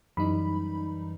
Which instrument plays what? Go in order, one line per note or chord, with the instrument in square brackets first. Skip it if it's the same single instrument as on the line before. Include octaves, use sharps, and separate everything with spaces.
[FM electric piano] F#2 E3 G3 D#4 B5